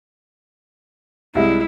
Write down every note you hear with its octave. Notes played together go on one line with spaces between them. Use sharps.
C2 G3 G#3 E4